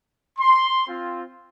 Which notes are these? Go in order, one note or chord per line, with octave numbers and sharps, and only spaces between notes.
C6
C4 F4